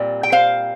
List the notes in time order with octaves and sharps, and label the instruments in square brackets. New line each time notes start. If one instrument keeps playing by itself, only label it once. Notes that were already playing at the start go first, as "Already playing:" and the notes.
Already playing: [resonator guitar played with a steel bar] A#2 G3 C4
G5
C5 F5